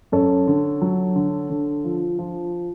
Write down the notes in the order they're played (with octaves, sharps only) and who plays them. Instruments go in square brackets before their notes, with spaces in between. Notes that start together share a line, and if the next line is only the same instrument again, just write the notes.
[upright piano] F#2 A4 C#5
D3
F#3
D3
D3
F3
F3